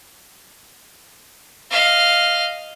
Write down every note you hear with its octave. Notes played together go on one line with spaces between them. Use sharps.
D#5 F5